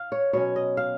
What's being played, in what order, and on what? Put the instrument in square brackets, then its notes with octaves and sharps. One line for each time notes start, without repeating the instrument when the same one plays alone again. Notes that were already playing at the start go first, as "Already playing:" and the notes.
Already playing: [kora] F5
C#5
B2 F#3 C#4 C#5
D#5
F5